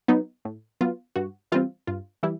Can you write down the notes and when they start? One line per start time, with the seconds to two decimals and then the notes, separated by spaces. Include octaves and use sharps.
0.08 F#3 B3 D#4
0.45 A2
0.81 F#3 B3 F4
1.16 G2 F#4
1.52 E3 G3 C4 F4
1.87 G2 F4
2.23 E3 G3 E4